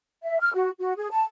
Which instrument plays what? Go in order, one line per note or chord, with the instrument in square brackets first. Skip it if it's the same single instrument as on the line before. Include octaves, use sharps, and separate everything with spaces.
[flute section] E5
F6
F#4
F#4
G#4
A5